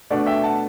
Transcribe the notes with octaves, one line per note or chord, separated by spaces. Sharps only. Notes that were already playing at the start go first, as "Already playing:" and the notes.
B2 A3 D4 D5 F#5
E5 G5
F#5 A5